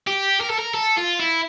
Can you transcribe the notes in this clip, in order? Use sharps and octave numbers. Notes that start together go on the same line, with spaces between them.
G4
A#4
A4
A#4
A4
F4
E4